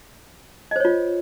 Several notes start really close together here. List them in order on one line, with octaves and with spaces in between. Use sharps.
D#5 C5 C#5 F4